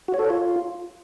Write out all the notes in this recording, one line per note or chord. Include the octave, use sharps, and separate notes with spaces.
F#4
C#5
A4
C#5
F4